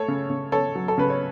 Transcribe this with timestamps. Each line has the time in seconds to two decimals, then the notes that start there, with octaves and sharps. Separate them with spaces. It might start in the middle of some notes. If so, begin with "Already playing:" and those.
Already playing: A3 A4 C#5
0.08 C#3
0.30 C#3
0.52 C#3 A4 C#5
0.75 F#3
0.88 A4
0.98 C#3 B4
1.10 C#5